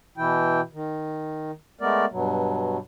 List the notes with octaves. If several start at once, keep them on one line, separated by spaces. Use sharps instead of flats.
B2 E3 E4 G5
D#3
G#3 A3 B3 A#4 D5
G2 B2 F#3